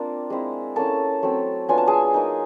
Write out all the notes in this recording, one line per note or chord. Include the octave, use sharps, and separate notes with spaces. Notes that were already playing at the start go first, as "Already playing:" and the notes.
Already playing: A#3 C4 D4 F4
G#3 C4 E4
A#3 C#4 E4 A4 A5
F#3 A3 C4
F#3 B3 D4 F4 G#5
A5
G#4 G#5
A#3 D#4